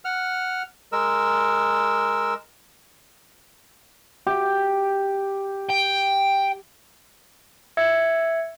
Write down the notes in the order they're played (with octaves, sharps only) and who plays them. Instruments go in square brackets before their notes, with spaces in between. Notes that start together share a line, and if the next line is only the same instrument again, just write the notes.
[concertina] F#5 F6
G#3 A#4 E6
[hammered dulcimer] G4
[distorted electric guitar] G5
[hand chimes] E5 E6 G#6 C#7